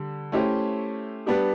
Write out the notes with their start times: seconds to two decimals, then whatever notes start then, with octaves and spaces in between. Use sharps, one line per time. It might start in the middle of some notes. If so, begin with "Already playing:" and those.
Already playing: D3 G3
0.32 A3 C#4 E4 G4 C5
1.26 G3 B3 D4 G4